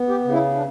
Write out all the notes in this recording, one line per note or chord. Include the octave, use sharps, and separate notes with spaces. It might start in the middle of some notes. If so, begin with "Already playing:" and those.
Already playing: B3
G4
C#3
E4
D4